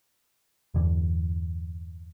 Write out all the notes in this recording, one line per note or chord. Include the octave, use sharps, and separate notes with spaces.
E2 G2 D3 E3